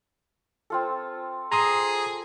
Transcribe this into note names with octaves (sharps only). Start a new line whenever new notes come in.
C4 F4 A4
G#4 A#5 C6 D#6